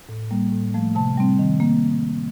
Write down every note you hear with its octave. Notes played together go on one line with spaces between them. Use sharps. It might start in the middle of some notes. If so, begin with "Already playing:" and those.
A2
G3 A#3
A2
F3 A3
C3 A5
G3 C4
D#3
A#3